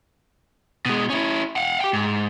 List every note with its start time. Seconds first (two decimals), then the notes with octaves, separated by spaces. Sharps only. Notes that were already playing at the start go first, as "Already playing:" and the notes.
0.86 B2 G#3
1.10 C#4 E4
1.56 F5 F#5
1.80 G4 G5
1.93 G#2